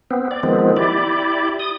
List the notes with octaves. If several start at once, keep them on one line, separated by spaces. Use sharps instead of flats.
B3 C4
D5
D#3 F3 G#3 B3 C4
E4 G4 D5
D#6